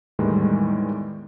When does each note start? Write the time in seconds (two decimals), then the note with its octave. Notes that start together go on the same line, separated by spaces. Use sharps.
0.19 E2 A2 D#3 E3 G3 G#3